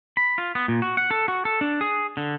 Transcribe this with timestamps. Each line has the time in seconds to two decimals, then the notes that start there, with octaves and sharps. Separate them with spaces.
0.17 B5
0.38 F4
0.55 B3
0.68 A#2
0.82 F#4
0.97 F#5
1.11 A4
1.28 F#4
1.45 A4
1.61 D4
1.81 G#4
2.17 D3